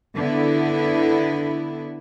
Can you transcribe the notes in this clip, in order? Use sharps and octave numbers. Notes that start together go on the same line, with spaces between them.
D3 B3 E4